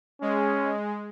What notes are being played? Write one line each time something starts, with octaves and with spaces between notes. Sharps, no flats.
G#3 C#4